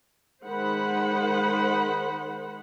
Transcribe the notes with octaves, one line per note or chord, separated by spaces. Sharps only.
D#3 G#3 C5 F#5 B5